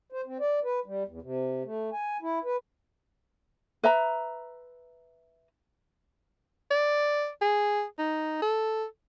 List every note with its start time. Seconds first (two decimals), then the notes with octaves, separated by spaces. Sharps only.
0.12 C5
0.26 C4
0.40 D5
0.64 B4
0.86 G3
1.07 E2
1.22 C3
1.64 A3
1.93 G#5
2.22 E4
2.44 B4
3.83 B4 E5 A#5
6.71 D5
7.41 G#4
7.99 D#4
8.42 A4